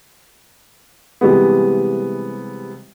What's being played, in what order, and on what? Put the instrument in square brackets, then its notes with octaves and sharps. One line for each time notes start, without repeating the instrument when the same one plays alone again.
[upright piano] C3 E3 G3 G#3 B3